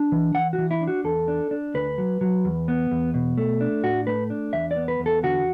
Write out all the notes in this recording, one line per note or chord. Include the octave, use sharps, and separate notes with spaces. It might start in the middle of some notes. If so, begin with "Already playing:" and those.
Already playing: D4
E3
E3 F#5
F#4
E3
E4
D4
F#4
E2 A4
D4
D4
D2 B4
F#3
F#3
E2
B3
E2
B2
A3
D4
A2 F#4
A3 B4
D4
E2 E5
D5
B3
B4
E2
A4
D3 F#4